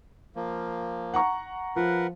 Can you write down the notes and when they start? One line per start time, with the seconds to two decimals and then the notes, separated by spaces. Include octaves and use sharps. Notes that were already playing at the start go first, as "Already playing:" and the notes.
0.36 F3 A#3
1.14 F#5 A#5 C#6
1.76 F3 A#4 B4 F#5